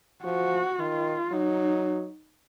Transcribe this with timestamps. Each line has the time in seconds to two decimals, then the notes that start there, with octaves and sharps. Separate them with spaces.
0.25 F3 F#4
0.79 D#3 F4
1.32 F#3 D#4